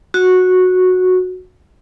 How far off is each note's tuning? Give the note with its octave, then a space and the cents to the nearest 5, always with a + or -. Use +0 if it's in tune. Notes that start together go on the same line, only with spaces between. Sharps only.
F#4 -10